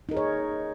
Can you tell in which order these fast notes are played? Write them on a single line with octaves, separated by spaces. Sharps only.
D#4 A#4 G#4 C#5